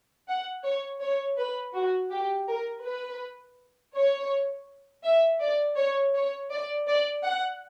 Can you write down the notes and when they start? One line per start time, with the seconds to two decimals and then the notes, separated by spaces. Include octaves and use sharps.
0.28 F#5
0.64 C#5
1.02 C#5
1.37 B4
1.75 F#4
2.11 G4
2.48 A#4
2.85 B4
3.94 C#5
5.04 E5
5.41 D5
5.77 C#5
6.14 C#5
6.50 D5
6.87 D5
7.23 F#5